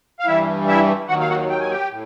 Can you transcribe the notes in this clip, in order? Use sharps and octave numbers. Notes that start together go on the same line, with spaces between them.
F5
G2 E3 G3 E4 E5
E4 E5
D#2 D#3 F#3 F#4 F#5
F5
F#4 F#5
G5
G#5
G4 G5
A2